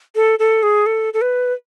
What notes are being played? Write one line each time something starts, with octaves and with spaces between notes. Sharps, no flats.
A4
A4
G#4
A4
A4
B4